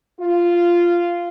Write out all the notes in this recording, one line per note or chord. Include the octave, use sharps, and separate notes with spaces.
F4